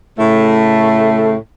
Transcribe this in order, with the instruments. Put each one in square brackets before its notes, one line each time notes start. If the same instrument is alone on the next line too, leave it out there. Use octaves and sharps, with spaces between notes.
[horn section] A2 C#3 A3